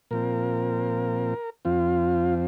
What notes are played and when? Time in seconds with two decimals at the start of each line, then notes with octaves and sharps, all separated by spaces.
0.11 A#2 F3 C4 A#4
1.65 F2 F3 C4 F4